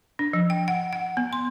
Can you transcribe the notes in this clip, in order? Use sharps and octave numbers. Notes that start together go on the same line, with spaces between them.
D4
F3
G5
F#5
F#5
B3
C6